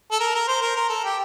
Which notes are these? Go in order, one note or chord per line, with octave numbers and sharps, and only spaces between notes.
A4
A#4
A#4
C5
A#4
A#4
A4
G4